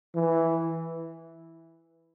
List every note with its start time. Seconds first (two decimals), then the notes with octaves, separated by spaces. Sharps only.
0.15 E3